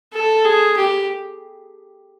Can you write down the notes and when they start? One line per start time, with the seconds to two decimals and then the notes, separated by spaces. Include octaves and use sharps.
0.13 A4
0.44 G#4
0.76 G4